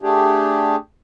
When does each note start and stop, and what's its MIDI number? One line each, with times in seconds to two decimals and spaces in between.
0.02 0.76 57
0.02 0.76 62
0.02 0.76 67
0.02 0.76 68